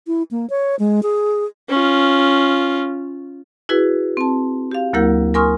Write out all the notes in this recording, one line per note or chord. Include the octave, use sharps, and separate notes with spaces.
E4
A#3
C#5
G#3
G#4
C#4 F4
E4 F#4 G#4 B4
C4 A5
G4 F5
D2 F#3 A#3 E4 A#4 G6
A#4 G#5 C6 C#6 D#6 F6